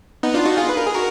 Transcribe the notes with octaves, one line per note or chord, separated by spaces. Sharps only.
B3 D#4
D4 F4
D#4 F#4
F4 G#4
B4
A#4
G#4
F#4 A#4